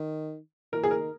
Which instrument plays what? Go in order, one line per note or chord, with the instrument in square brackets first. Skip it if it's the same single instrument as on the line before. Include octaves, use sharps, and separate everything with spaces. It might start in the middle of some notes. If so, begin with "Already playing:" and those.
Already playing: [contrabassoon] D#3
[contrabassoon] E3 [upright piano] A#4
[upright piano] G#4
A#4
[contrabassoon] D#3